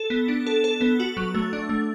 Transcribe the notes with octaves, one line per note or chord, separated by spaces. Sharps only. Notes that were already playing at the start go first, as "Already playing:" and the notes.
Already playing: A4
B3
D4
A4
A4
B3
F#4
F#3
A3
D4
A3